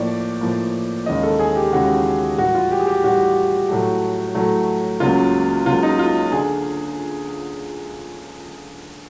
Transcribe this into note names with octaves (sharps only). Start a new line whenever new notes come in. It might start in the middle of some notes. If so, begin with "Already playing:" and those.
Already playing: A2 F3 A#3 D5
A2 F3 A#3
D#2 C#3 E3 G#3 D#5
A4
G#4
G4
D#2 C#3 E3 G#3 F#4
A2 E3 G3 F#4
F4
G4
G#4
G4
A2 E3 G3 F#4
A2 F#3 A3
A2 F#3 A3
C#2 C#3 F#3 A#3 F4
C#2 C#3 F#3 A#3 F4
D#4
F4
D3 G#4